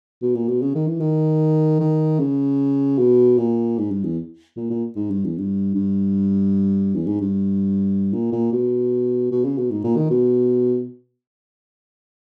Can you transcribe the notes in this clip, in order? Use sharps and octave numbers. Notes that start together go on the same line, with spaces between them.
B2
A#2
B2
C#3
D#3
E3
D#3
D#3
C#3
B2
A#2
G#2
G2
E2
A#2
A#2
G#2
G2
E2
G2
G2
E2
G#2
G2
A#2
A#2
B2
B2
C#3
B2
G#2
A#2
D#3
B2